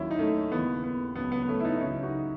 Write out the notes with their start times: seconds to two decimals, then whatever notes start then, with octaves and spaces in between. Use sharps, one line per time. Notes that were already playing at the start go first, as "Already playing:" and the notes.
Already playing: D#2 D#3 F#3 C#4 E4
0.11 D#4
0.19 A3 C#4
0.52 D#2 C#3 E3 B3
0.84 B3
1.15 C#2 C#3 F#3 B3
1.32 B3
1.43 B3
1.48 A3 C#4
1.60 E4
1.65 B3 D#4
1.77 D#4
1.81 C#2 C#3 F#3 C#4 E4
2.02 D#4 F#4